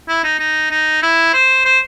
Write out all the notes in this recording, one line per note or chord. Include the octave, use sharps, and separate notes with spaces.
E4
D#4
D#4
D#4
E4
C5
C5